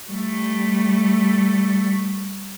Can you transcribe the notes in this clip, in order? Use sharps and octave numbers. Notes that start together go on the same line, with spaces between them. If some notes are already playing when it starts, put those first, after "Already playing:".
G3 A3